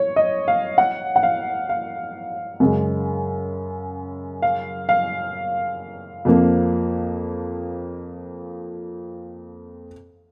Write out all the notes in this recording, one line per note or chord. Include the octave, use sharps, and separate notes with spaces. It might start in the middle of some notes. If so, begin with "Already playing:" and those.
Already playing: C#5
D#5
F5
F#5
F#5
F5
F5
F#2 C#3 G#3
F5
F5
F2 F3 A#3